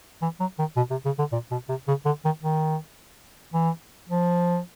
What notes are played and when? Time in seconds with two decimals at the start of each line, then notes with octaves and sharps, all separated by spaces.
0.22 E3
0.40 F#3
0.59 D#3
0.77 B2
0.91 C3
1.05 C#3
1.19 D3
1.32 A#2
1.51 B2
1.69 C3
1.88 C#3
2.05 D3
2.25 D#3
2.43 D#3
3.54 E3
4.09 F3